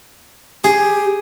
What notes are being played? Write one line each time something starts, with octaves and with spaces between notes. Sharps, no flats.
G4 G#4